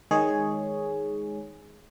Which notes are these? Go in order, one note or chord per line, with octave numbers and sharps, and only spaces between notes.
D#3 G#3 G#4 C#5